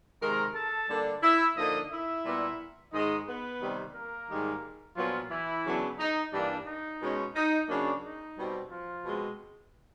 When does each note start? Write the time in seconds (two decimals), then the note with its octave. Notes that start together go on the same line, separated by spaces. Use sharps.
0.21 C3 D#3 G#3 A#4 A#5
0.55 A4 A5
0.89 D3 G3 A#3 D4
1.23 E4 E5
1.57 D3 F3 A#3 D#4 D#5
1.91 E4 E5
2.25 A#2 G3 B3
2.93 G#2 D#3 G#3 D#4 D#5
3.27 B3 B4
3.61 C3 D#3 G3 C4
3.95 A#3 A#4
4.29 G#2 D#3 G3
4.97 A#2 F3 F#3 B3 D4 F4
5.31 E3 E4
5.65 C#3 F#3 B3 D4
5.99 D#4
6.33 G2 E3 G3 A#3 D4
6.67 D#4
7.01 B2 G#3 C#4
7.35 D#4
7.69 C#3 F#3 A#3 D4
8.03 D#4
8.37 B2 G3 C4
8.71 F3 F4
9.05 B2 G#3 C4